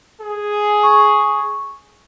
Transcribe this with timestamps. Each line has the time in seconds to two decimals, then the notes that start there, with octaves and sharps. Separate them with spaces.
0.21 G#4
0.83 C#6